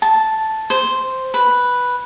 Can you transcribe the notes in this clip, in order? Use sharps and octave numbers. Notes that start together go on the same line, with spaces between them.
A5
C5
B4